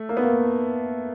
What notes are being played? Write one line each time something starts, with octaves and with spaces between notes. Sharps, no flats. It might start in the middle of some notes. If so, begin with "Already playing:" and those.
Already playing: A3
A#3
B3
A#3